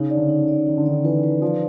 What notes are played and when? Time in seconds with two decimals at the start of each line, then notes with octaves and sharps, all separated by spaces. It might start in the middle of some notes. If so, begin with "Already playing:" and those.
Already playing: C#3 D#4
0.10 D5
0.17 D3
0.29 D#4
0.42 D3
0.48 D5
0.67 D#3 D#4
0.78 D3
0.86 D#3 D5
1.04 E3 B4
1.23 B4
1.42 F3 D5